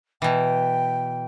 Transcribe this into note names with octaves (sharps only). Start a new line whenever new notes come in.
B2 E3 G5